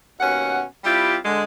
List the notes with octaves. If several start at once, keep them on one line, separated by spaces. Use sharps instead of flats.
D#2 B2 C#4 F#5
G3 C4 E4 F4 G4
D3 G#3